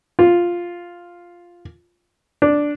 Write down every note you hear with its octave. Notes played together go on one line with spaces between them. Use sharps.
F4
D4